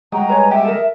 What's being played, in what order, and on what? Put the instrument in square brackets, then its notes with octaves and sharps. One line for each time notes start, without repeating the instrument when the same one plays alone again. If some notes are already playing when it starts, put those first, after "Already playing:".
[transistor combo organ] G3 G#3 D#5 [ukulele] F#4 G5 [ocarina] A#5
[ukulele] B4 C#5 G#5
[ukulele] G4 F#5 G5 [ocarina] E5
[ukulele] A4 A#4